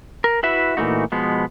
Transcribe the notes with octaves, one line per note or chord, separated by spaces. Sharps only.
A#4
E4 F#4 B4 E5
A#2 E3 F3 A3 D#4 F#4
B2 F3 G#3 B3